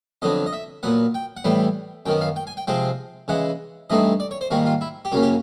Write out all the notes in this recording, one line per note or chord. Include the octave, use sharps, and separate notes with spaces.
F2 D3 F#3 B3 D4 D#5
D#5
E5
A#2 F#3 B3 F#5
G5
F#5
A2 E3 G3 B3 G5
F#2 D#3 F#3 B3 G5
F5
G5
G#5
G5
C3 F3 G#3 C4 G5
C#3 E3 G#3 F#5
G2 E3 A3 C4 D#4 D#5
D5
C#5
C5
G#2 D#3 G3 A#3 F#4
F4
E4
G4
F#2 C#3 F#3 A#3 C#4 F#4
G4